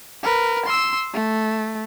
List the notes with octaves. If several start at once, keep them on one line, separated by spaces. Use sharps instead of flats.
A#4 B4
C6 E6
A3